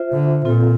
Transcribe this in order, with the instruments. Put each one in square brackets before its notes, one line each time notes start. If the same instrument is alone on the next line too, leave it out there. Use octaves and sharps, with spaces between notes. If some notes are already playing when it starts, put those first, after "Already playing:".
Already playing: [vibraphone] F4 C5 E5
[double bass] D3
[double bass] A#2 [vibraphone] C4 F4 A4